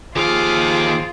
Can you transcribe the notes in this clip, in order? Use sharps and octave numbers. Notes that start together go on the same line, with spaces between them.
D#2 F3 F4 G#4 F5 D6